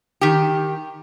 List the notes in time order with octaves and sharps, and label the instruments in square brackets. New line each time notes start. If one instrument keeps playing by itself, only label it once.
[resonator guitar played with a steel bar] D#3 G4